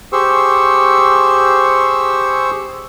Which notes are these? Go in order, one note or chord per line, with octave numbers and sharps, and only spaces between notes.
G4 G#4 C5 C#6 E6